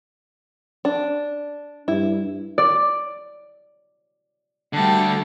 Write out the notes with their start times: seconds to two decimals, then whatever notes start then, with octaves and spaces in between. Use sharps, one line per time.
0.85 D4
1.88 G2 E4
2.58 D5
4.73 D3 G3 A3 A4 G5